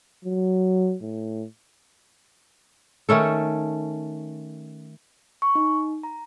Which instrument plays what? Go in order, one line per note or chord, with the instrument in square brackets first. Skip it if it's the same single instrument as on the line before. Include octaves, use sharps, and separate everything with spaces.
[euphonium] F#3
A2
[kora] D#3 A3 C#4 A4
[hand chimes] C#6
D#4
A#5